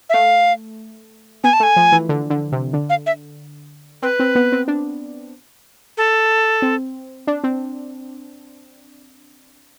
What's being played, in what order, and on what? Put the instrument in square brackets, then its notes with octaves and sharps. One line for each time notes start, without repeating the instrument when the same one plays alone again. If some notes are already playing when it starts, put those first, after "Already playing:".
[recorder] E5
[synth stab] A3 [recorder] F5
[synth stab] B3 [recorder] G#5
[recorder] A5
[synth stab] A3
[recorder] G#5
[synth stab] F3
E3
D3
D3
C3
D3
[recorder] F5
E5
[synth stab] C4 [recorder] B4
[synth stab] C4
B3
C4
D4
[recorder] A4
[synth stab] C4
D4
C4